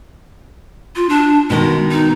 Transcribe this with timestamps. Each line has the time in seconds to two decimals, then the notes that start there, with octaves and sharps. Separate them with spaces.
0.96 F4
1.09 D4
1.50 B2 D#3 G#3
1.91 D#4